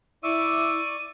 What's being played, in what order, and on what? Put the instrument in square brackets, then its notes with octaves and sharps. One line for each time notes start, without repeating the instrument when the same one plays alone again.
[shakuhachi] E4 [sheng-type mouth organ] D5 C#6 D6 [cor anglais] E5 [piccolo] D#7